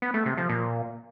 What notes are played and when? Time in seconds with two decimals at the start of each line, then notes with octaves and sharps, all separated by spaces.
0.02 B3
0.14 A3
0.26 C3
0.37 F3
0.49 A#2